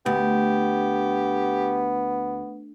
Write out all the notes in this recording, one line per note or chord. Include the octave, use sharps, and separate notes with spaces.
D2 B3 G4